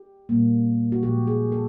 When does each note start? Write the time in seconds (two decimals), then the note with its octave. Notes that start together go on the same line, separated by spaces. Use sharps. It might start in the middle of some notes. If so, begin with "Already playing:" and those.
Already playing: G4
0.29 A#2 G3 A#3
0.92 F#4
1.03 A#2 F3 G#3 G4
1.27 G#4
1.52 A4